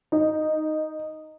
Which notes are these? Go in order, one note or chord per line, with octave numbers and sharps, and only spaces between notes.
D#4